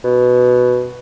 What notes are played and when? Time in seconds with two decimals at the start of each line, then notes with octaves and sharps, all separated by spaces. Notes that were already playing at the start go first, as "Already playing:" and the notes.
0.04 B2